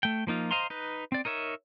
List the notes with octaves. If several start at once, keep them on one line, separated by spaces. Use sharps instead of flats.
A3 G5
F3 A#3 D#4 F4
C5 D#5 F5 A#5 C6
D#4 B4
C4 D5
D#4 A#4 C#5 E5